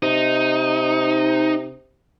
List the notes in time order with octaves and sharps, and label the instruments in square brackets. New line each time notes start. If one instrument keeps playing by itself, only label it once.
[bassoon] C3 [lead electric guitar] D#4